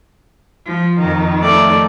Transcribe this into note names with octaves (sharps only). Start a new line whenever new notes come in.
F3
F2 D#3
A3 D5